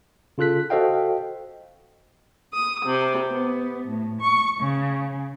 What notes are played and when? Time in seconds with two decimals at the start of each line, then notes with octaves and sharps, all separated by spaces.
0.38 C#3 F4 A4 F#6 B6
0.70 F#4 A4 C5 D#5 F5 G5
2.53 D#6
2.81 C3
3.30 B3
3.87 A2
4.20 C#6
4.60 C#3